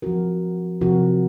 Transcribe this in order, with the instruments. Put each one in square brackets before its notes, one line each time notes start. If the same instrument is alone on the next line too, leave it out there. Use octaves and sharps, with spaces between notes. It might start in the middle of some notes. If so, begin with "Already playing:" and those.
[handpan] F3 C4 F#4 A#4
C3 F3 C4 F#4 A#4